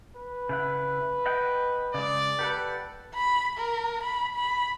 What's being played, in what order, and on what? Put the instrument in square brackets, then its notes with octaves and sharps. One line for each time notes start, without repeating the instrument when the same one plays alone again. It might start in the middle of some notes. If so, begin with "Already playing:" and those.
[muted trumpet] B4
[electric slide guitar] C#3 E4 F#5
D#5 F#5 G5
[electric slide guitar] C#3 G#3 [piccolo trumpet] D5
[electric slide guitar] G4 A4 F#5 [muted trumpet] B4
[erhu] B5
A#4
B5
B5